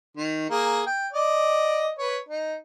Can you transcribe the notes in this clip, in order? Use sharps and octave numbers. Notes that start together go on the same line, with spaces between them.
D#3
A#3 G#4
G5
D5 D#5
B4 C#5
D#4